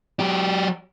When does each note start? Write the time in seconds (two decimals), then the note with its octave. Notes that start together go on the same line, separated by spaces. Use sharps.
0.20 F#3 G4